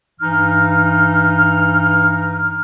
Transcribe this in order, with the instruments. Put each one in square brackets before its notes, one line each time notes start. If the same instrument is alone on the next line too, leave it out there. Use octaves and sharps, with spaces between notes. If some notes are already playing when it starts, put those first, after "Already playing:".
[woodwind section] G2 E3 D#4 F6